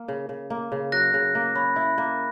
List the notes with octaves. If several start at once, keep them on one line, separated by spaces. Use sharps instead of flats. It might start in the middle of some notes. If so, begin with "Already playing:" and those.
Already playing: A#3
C#3
C#3
A#3
C#3
F#3 F#6 A#6
C#3
A#3
C#4 B5
E4
A#3